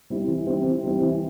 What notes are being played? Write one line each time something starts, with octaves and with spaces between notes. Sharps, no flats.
G3 C4 E4
E3
G3 C4 E4
E3
G3 C4 E4
E3